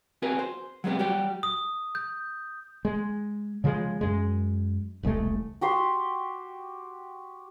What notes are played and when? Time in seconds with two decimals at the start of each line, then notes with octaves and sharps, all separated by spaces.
0.22 C4 F#4 G#4 A#4 B4
0.39 C5
0.84 F#3 G#3 B3 C4 G4
0.99 F#3 G3 F#4 G4
1.43 D#6
1.95 G6
2.85 G#3
3.64 C#3 F3 G3 G#3
4.01 F#2 G#3
5.03 E1 C2 G#3 A3
5.61 F#4 G4 C6